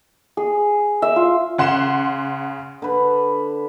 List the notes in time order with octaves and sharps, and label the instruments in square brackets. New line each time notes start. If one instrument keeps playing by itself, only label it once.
[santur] G#4
E5
F4
[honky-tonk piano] C#3 F#5 C6 E7
[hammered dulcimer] D3 B4